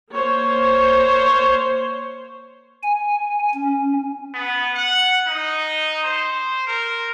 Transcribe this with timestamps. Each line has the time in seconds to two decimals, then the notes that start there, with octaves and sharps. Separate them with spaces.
0.13 A#3 C5 C#5
2.83 G#5
3.54 C#4
4.34 B3
4.74 F#5
5.27 D#4
6.03 C5
6.67 A#4